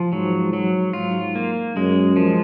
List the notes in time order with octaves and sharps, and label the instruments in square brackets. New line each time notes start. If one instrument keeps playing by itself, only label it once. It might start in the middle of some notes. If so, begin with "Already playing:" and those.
Already playing: [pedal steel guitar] F3
[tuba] G#2 [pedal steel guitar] F#3
[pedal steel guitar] F#3
[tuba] G#2 [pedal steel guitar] F4
[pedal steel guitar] A#3
[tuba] F#2 [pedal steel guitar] G#3
[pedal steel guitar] F3